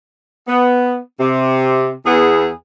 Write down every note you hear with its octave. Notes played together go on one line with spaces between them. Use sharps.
B3
C3
E2 B3 G#4